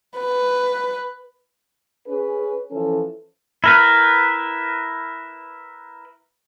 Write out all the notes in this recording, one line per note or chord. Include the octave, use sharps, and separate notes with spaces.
B4
C#4 G#4 B4
E3 F3 C#4 A4
E4 A#4 B4